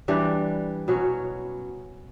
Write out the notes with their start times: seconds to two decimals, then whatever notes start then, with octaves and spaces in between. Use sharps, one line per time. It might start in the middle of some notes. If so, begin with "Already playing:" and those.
0.08 E3 G3 D4
0.88 B2 F#3 C#4